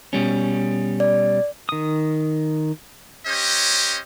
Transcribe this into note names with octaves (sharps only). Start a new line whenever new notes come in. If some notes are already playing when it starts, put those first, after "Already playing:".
B2 G3 C#4
D5
D#3 D#6
C#4 G4 C5 C#5 D#5